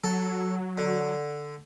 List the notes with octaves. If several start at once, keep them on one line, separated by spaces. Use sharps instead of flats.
F#3 A4
D3